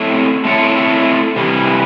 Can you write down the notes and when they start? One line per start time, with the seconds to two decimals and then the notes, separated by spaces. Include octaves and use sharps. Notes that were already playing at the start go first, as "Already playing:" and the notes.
Already playing: A3 C4 E4 A4 C#5
0.45 A3 C4 E4 A4 C#5
1.36 C3 E3 G3